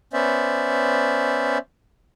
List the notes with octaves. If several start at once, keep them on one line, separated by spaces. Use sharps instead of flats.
B3 C#4 C5 D5 E5